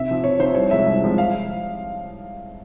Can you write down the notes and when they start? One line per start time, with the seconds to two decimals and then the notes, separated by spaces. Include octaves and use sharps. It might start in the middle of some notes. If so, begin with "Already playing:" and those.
Already playing: C3 E5
0.09 F3 C4
0.24 C3 C#5
0.39 F3 C4 C5
0.55 C2 C#5
0.71 C3 F3 G#3 E5
0.86 C2
1.02 C3 F3 G#3
1.18 F5